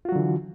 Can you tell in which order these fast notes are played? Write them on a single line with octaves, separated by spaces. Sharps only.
F4 F#4 F#3 D3 E3